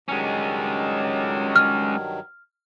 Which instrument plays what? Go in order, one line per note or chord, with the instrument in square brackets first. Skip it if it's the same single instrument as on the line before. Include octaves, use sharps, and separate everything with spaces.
[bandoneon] G2 D#3 F#3 [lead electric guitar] G#3 C#4
[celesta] F6